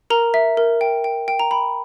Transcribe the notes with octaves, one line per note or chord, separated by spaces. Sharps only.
A#4 A#5
E5
A#4
G5
G5
G5
A#5
G5 B5